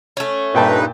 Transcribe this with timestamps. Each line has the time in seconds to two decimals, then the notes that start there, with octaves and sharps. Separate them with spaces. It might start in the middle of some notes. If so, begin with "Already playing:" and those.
0.17 A3 C#4
0.54 G2 A#2 D#4 B4 G5 A5